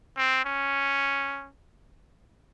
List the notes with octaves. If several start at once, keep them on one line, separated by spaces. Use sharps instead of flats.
C4
C#4